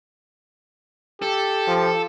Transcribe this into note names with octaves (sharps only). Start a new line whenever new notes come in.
G4 A4
F3